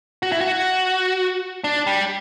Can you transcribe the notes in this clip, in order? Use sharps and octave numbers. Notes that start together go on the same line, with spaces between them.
F#4
E4
F#4
D4
G3